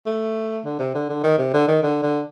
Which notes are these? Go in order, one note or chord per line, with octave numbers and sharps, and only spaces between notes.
A3
D3
C3
D3
D3
D#3
C3
D3
D#3
D3
D3